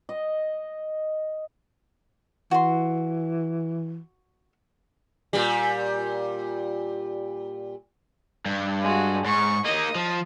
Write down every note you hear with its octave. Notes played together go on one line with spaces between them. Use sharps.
D#5
E3 F#4 C6
A#2 G3
G2
G#3 F#4
G#2 C#6
A#3 D#4 D#5
F3